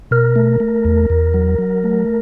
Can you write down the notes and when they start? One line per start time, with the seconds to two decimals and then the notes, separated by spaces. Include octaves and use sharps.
0.11 B2 A#4
0.36 A3
0.60 A3
0.85 E2
1.10 E2
1.34 F#3
1.59 F#3
1.84 A3